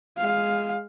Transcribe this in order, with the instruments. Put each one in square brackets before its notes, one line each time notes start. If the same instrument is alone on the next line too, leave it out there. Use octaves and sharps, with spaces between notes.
[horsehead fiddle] G#3 F5